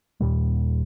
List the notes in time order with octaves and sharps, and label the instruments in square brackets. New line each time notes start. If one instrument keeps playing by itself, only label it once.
[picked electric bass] D#2 A#2 G3